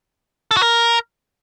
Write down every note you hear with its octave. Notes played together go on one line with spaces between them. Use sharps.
A4
F#4
A#4